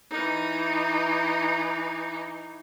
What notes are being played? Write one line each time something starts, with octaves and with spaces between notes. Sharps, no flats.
E3 D#4